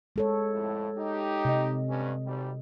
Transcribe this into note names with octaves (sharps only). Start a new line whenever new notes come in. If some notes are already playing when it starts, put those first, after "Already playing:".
G#3 A4 C#5
F2 A2
D#4 G4
C3 D#5
G2 C#4
G#1 G3